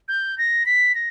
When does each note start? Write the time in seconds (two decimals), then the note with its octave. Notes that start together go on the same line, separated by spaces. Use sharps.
0.08 G6
0.38 A#6
0.66 B6
0.95 A#6